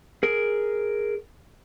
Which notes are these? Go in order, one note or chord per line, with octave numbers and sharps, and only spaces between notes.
G#4 A#4